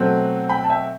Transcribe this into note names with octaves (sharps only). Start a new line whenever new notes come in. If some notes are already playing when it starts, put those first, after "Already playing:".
Already playing: B2 F#3 A3 C4
G5 B5
A5
E5 G5